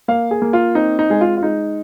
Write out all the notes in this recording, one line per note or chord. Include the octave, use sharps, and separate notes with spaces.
A#3 F5
G#4
A#3
F4
C4 D#4
D#4
G#3 G#4
F4
F4
G#3 D#4